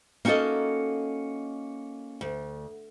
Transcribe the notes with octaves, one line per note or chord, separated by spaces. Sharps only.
A#3 C#4 D#4 F#4 A4 D#5
D2